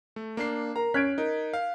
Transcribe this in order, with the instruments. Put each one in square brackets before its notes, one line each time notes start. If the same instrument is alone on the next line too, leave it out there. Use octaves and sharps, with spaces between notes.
[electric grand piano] A3
A#3 D4 C7
[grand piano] A#4 [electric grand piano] A#5
[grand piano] C#4 G#6 D7 [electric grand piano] F6 F#6 B6
[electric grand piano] D#4 [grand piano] A#4
[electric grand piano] F5